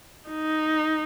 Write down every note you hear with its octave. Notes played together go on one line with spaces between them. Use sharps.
D#4